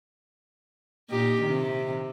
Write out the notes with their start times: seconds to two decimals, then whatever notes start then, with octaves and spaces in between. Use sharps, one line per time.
1.10 A#2 D#4 G4
1.42 C3 D#3